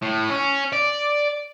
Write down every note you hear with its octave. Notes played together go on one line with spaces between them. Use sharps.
A2
C#4
D5